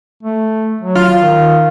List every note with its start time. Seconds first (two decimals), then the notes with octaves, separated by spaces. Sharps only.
0.23 A3
0.82 F#3
0.95 F4
1.19 D#3